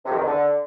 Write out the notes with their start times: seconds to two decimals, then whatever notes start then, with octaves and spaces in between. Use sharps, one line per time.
0.05 C3
0.10 F2
0.15 D#3
0.20 E2
0.25 D3